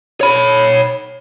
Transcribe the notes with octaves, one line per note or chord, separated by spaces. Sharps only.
C#5 B5